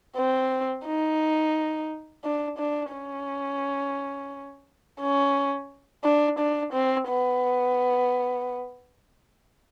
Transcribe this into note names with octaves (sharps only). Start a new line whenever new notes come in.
C4
D#4
D4
D4
C#4
C#4
D4
D4
C4
B3